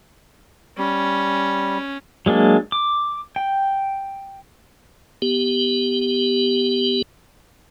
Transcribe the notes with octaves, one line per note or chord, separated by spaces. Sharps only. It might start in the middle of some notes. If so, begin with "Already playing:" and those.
G3 C#4
F#3 G#3 A#3 D4
D6
G5
B3 G4